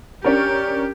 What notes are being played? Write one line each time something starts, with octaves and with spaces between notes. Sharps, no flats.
C#4 D4 G4 A#4